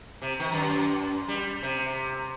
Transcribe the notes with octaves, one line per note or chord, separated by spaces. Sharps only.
C3
D#3
F#2
G3
C3